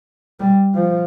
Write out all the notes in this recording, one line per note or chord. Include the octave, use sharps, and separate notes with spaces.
G3
F3